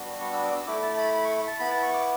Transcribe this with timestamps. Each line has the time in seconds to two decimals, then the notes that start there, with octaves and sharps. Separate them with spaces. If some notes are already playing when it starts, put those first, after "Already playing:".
Already playing: G3 B3 D4 F#4
0.21 C#6
0.33 E6
0.44 D6
0.56 E6
0.67 A3 E4 D6
0.83 A5
0.98 B5
1.14 B5
1.25 C#6
1.47 A5
1.59 B3 E4 B5
1.71 A5
1.83 C#6
1.94 D6